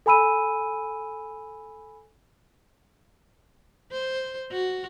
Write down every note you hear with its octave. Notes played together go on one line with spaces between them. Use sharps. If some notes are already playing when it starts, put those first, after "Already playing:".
A4 G#5 B5 E6 D#7
C5
F#4